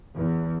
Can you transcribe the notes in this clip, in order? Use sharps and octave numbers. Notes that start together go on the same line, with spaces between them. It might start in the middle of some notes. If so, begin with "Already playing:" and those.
E2